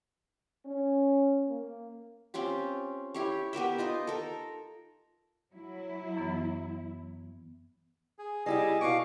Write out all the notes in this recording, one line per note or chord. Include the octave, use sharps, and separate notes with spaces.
C#4
A#3
C4 C#4 F4 G4
E4 G4 C#5
B3 G4 A#4 E5
D#4 F4 D#5
A4 A#4
F#3 E4
F#2 E3 B3
G#4
G3 E4 G4 G#4 D#5
B2 F#4 F5 C#6 D6